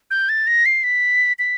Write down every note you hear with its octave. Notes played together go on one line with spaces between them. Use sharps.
G6
A6
A#6
C7
B6
B6